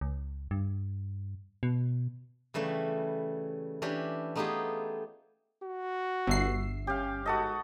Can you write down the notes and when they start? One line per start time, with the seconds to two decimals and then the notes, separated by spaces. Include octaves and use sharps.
0.01 C#2
0.51 G2
1.63 B2
2.54 C#3 E3 G3 A3 C#4
3.82 E3 C#4 D4 G4
4.35 A3 B3 D#4 F4 G4 G#4
5.63 F#4
6.27 G1 E5 C7
6.87 C#4 G4 F5
7.26 G#2 F#4 A4 D#5